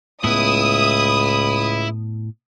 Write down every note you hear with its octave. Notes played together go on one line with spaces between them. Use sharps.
C#2 A2 B3 E4 D#6